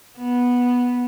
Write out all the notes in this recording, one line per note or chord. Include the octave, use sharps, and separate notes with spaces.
B3